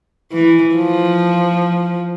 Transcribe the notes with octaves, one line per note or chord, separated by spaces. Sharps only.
E3
F3